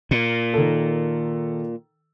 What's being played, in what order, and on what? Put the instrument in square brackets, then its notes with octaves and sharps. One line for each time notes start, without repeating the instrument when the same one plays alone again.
[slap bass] A#2
[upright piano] D#3 A4